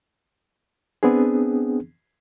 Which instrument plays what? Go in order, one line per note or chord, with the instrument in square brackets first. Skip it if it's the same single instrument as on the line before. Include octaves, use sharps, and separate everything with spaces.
[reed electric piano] B3 C4 D4 G#4